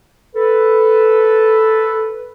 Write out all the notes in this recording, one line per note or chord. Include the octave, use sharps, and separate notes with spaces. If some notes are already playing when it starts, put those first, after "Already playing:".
A4 B4